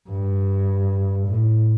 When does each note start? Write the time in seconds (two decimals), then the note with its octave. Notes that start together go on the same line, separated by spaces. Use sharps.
0.09 G2
1.27 A2